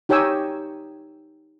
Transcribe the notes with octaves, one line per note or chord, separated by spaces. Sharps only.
D#4 G4 C#5 G5 G#5 E6